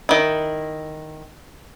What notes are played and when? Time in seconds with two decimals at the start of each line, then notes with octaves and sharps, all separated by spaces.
0.09 D#3 E4